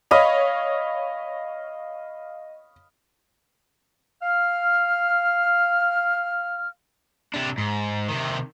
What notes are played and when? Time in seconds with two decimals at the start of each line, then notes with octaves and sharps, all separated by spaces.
0.11 C#5 D#5 F5 B5
4.22 F5 F6
7.34 C3 D4
7.58 G#2
8.09 C3 D#3